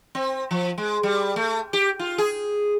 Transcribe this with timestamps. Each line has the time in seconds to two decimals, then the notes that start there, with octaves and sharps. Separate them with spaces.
0.15 C4
0.51 F3
0.78 G#3
1.03 G3
1.36 A3
1.73 G4
1.99 F4
2.18 G#4